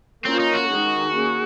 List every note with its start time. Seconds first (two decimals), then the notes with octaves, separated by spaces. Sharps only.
0.25 A#3 C4 C#4 F4 A#4 C#5
0.39 D#4
0.54 F#4
0.68 D#3 G#3 D#4 G#4
1.11 A#3 C#4 G#4